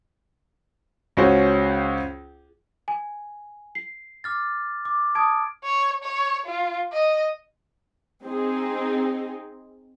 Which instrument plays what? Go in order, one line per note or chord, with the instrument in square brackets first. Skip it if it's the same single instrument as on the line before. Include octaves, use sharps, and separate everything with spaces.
[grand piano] C#2 C#4 F#4 C5
[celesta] G#5
C7
[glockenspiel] D6 F6 A6
D6
[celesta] A5 D#6 [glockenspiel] G#6 D7
[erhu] C#5
C#5
F4
D#5
[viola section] C4 D#4 G#4